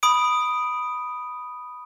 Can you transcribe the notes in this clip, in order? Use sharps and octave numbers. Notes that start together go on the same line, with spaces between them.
B5 D#6 D7